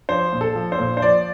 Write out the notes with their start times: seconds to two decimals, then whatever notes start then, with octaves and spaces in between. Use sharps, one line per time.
0.09 F3 C5
0.33 A#2
0.41 A4
0.55 F3
0.72 C5
0.79 A#2
0.97 C5
1.02 F3 D5